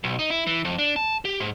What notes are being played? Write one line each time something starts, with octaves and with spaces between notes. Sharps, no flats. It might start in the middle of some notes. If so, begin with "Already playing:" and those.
B1
D#4
E4
E3
F2
D4
A5
G4
G#2